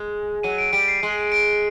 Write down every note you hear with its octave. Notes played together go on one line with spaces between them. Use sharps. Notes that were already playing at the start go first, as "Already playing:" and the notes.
Already playing: G#3
F#3 D#7
D7
G3 D7
C7
G#3
D7